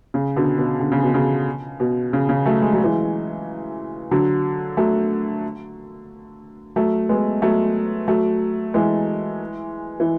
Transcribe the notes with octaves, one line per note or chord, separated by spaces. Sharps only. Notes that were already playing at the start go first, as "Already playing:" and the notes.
C#3
B2 D3
B2
D3
C#3
B2
C#3
B2
C#3
C#3
F#3 A3
G#3
F#3
E3 G#3
D3 F#3
F#3 A3
F#3 A3
G#3 B3
F#3 A3
F#3 A3
E3 G#3
E3